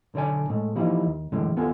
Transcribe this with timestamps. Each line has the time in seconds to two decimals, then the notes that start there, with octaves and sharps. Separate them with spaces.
0.14 B1 D3 C#5 D5 G#5
0.49 A2 G#3 A3
0.75 E3 F3 G3 A#3 D#4 E4
1.06 D#2
1.32 F#2 A2 D3 E3 G#3 C#4
1.57 D#2 B3 F4 A4 G#5